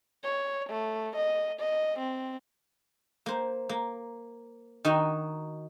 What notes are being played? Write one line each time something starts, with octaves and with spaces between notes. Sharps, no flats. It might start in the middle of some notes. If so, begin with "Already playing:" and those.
C#5
A3
D#5
D#5
C4
A#3 C5
A#3
D#3 D#4 F#4